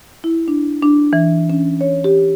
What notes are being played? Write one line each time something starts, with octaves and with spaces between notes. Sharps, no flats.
E4
D4
D4
E3
C#4
C#5
G4